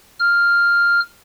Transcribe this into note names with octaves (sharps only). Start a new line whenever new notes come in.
F6